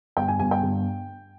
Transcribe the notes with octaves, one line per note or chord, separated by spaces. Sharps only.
G1 G5
G#5
G1 G#5
G5
G1